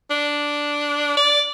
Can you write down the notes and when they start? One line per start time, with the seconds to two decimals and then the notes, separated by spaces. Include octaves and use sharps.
0.10 D4
1.17 D5